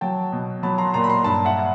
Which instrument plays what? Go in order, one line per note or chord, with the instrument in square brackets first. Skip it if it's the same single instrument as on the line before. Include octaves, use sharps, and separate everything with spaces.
[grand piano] F#3 G5 A5
B2
F#3 A5 B5
A#5 C6
A#2 A#5 C6
B5
A#5 C6
G2 A5 B5
E5 F#5
F#5